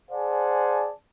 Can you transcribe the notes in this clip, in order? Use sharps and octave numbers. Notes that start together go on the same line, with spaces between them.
G#4 C5 D5 F#5 G#5 A5